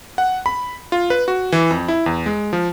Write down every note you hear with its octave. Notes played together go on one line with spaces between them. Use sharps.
F#5
B5
F4
B4
F#4
E3
F2
E4
E2
G#3
F3